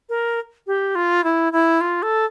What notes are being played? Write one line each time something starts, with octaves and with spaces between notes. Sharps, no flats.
A#4
G4
F4
E4
E4
F4
A4